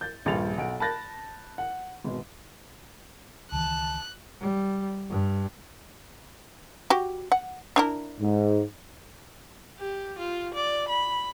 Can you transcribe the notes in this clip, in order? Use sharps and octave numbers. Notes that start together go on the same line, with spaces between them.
G6 A6
D#1 A#1 G2 A6 F7
B1 F#5 D7
A5 B5 F#6 G6 A6 A#6
F#5
G#1 B2
C#2 D#3 E3 A5 F#6
G3
G2
F#4 G4
F#5
D4 E4 A#4
G#2
G4
F4
D5
B5